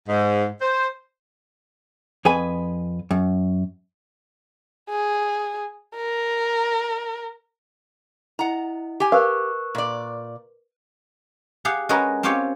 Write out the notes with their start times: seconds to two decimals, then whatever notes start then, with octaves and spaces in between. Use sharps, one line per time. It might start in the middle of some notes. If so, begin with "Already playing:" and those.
0.09 G#2
0.61 C5
2.25 F2 G#4 B4 G#5
3.11 F#2
4.89 G#4
5.95 A#4
8.39 E4 D#5 F#5 A#5
9.00 G4 G#5
9.12 A#4 B4 F5 C#6 E6 F#6
9.75 A#2 D5
11.65 G4 G#4 F5 F#5
11.89 G#3 C#4 F#4 G#4 A#4 B4
12.23 C4 C#4 F4 G4 C#5 F5